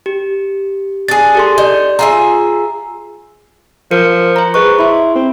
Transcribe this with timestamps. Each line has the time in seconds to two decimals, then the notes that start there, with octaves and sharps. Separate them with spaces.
0.06 G4
1.08 D4 G#4 A6
1.35 G4 A4 C6
1.58 D#4 D5
1.99 F4 G#4 E5 A#5
3.91 F3 A#4 C#7
4.36 C5 A#5
4.54 G#4 B4 D#5 C#6
4.79 E4 B5 C6
5.15 C4